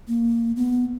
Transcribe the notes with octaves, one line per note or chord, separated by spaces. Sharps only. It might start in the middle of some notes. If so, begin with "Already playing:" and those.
A#3
B3